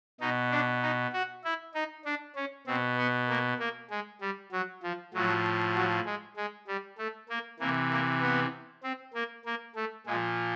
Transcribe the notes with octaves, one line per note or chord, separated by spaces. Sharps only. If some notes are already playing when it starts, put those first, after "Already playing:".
B2 D#4
D4
D#4
F#4
E4
D#4
D4
C#4
B2 C4
B3
A#3
A#3
G#3
G3
F#3
F3
A2 F3 F#3
F#3
G#3
G#3
G3
A3
A#3
C3 E3 A#3
A#3
B3
C4
A#3
A#3
A3
A#2 F3 G#3